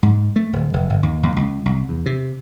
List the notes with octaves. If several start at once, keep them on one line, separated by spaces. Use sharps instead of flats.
G#2
A3
D1
F1
G1
D#2
D#2
C#2
C2
E2
C3